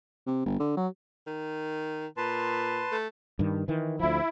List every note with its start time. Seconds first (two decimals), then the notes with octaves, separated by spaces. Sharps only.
0.27 C3
0.46 G1
0.60 D3
0.77 F#3
1.27 D#3
2.17 A#2 B4 A5 C6
2.92 A3
3.39 G2 D#3
3.68 D#3 E3
4.00 D2 F3 E4